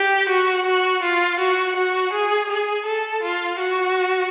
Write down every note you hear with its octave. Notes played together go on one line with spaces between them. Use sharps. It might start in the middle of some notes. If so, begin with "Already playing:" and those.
Already playing: G4
F#4
F#4
F4
F#4
F#4
G#4
G#4
A4
F4
F#4